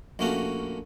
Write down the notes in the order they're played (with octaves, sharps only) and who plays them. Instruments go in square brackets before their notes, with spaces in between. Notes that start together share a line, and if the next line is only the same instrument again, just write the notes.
[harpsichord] A#1 A3 A#3 C#4 F#4